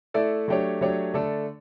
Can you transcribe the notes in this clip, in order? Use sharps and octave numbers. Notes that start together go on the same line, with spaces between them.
A3 E4 A4 D5
F#3 A3 D4 G4 C#5
F#3 A3 D4 G4 C#5
D3 A3 D4 A4